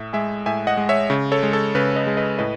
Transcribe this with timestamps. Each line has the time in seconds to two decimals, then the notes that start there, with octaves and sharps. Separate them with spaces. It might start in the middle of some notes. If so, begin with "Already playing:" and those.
Already playing: A2 E5
0.13 G#3 E5 G#5
0.46 A2 E5 G#5
0.67 D#5 F#5
0.77 G#3
0.89 C#5 E5
1.10 C#3
1.32 A4 C#5
1.43 G#3
1.53 A4
1.75 C#3 B4
1.96 B4 D#5
2.07 G#3
2.17 B4 D#5
2.38 A2 B4 D#5